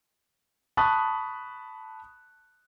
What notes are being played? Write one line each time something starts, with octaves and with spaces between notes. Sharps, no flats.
A5 B5 C#6 D#6 F#6